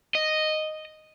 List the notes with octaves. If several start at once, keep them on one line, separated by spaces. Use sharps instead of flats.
D#5